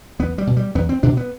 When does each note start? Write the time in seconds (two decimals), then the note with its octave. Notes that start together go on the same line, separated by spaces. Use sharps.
0.19 E2 B3
0.38 G3
0.47 B2
0.57 G3
0.75 E2 B3
0.89 C4
1.03 B2 D4
1.17 B3